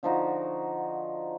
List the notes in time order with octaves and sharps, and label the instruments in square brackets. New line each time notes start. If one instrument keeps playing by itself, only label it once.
[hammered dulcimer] D3 F3 D#4 F#4